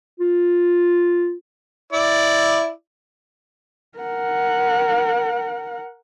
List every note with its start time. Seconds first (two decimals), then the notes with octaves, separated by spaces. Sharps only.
0.20 F4
1.93 E4 D5
3.99 A#4 F#5